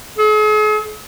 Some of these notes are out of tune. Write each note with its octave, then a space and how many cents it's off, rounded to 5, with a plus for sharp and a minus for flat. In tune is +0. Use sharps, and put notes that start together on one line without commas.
G#4 +45